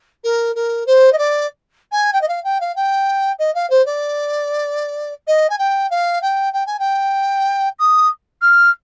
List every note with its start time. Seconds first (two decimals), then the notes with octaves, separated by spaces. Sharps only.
0.24 A#4
0.55 A#4
0.86 C5
1.12 D#5
1.18 D5
1.92 G#5
2.13 G5
2.21 D#5
2.28 F5
2.44 G5
2.60 F5
2.76 G5
3.39 D#5
3.55 F5
3.70 C5
3.86 D5
5.27 D#5
5.50 G#5
5.58 G5
5.90 F5
6.22 G5
6.53 G5
6.66 G#5
6.79 G5
7.79 D#6
8.42 F6